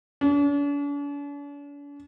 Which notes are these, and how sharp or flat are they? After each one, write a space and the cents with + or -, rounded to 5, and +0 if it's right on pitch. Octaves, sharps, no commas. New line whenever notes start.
D4 -45